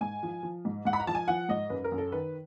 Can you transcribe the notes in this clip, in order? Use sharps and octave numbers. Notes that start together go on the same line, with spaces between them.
G#2 G#5
F3
F3
G#2
G#2 F#5
B5
A#5
F3 A5
G#5
F3 F#5
G#2 D#5
F#2 B4
A#4
F#2
A4
D#3 B4